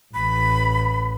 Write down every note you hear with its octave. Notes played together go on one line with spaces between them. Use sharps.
A1 B5